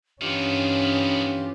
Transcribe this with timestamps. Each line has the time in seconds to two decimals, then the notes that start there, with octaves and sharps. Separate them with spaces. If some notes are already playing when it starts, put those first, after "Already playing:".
0.22 G2 D#3 E3 B3 C#4 D4 F4 G4